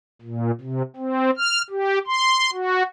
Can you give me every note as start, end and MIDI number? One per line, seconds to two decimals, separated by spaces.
0.22 0.51 46
0.61 0.82 48
0.96 1.31 60
1.37 1.62 89
1.70 1.99 67
2.07 2.50 84
2.53 2.83 66